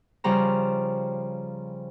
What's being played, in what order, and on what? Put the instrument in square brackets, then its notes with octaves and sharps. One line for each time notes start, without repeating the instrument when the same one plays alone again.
[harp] C#3 F3 G3 A#5